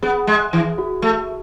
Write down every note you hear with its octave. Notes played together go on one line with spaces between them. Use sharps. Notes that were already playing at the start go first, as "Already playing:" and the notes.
B3 G#4
G#3
E3
F#4
A3